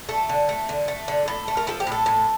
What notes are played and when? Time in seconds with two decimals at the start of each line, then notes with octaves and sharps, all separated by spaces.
0.09 A3 A4
0.29 D3
0.49 A3
0.69 D3
0.88 A3
1.08 D3
1.28 A2 A4
1.48 A3
1.57 A#4
1.67 F3 A4
1.80 G4
1.87 A2 A4
2.06 A2